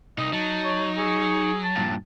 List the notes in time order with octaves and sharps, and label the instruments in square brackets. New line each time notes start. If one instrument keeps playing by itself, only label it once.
[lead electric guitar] C2 [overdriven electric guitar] D#4 [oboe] D#5
[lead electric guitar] F#3 [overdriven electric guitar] D#4 [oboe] A5
[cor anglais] C#5
[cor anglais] G#4 [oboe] C#6
[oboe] A5
[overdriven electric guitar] G2 A#2